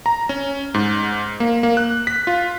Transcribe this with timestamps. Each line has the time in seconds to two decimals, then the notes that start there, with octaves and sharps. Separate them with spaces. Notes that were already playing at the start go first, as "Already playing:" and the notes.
0.06 A#5
0.29 C#4
0.74 G#2
1.40 A#3
1.63 A#3
1.77 F#6
2.07 B6
2.27 F4